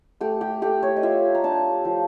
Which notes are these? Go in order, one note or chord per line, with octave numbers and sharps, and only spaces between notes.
A3 G4
G4
A3 G4
C#5
D#5
F4 E5
A#5
D4 A5
F3